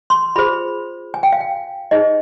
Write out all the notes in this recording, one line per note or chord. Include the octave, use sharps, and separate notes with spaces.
C6
F4 G#4 C5 B5
G#5
G5
F5
G5
D#4 G#4 C5 D#5